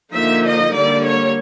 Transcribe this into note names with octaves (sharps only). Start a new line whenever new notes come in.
D3 F3 A#3 D#4 E5
D#5
D3 G3 A#3 D5
C#5